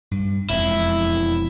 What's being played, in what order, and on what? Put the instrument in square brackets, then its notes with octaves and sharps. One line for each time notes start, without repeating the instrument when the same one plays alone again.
[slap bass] G2
[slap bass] E1 F2 G#3 [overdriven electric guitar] E4